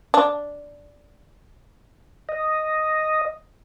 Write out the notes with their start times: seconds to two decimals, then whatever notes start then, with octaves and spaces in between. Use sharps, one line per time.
0.14 D4
2.29 D#5